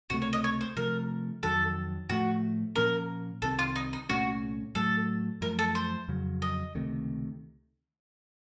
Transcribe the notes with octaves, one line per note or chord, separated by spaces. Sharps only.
C#2 C3 D#3 A3 F#4
C#5
D#5
C#5
C5
C3 F3 A3 A#4
F2 D#3 F#3 A4
A2 F3 A3 F#4
A#2 F3 A#3 C#4 A#4
C2 C3 D#3 A4
F4
D#4
D#4
C2 A#2 A3 C#4 F#4
A2 F#3 A3 A4
F#2 F3 A3 A#4
A4
C5
F2 C#3 F#3
D#5
C#2 C3 D#3 A3